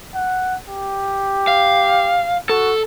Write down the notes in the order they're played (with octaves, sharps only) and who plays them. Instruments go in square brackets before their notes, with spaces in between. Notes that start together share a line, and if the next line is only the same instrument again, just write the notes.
[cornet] F#5
G4
[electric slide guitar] F5
[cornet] F#4 [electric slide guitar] A4